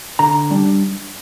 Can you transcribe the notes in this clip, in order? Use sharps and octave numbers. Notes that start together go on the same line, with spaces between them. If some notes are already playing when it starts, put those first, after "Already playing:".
D3 A#5
G3 D4